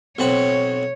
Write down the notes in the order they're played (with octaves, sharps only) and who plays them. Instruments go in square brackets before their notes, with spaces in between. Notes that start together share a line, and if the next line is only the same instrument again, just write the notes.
[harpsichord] B1 C4 B4 [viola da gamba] C#5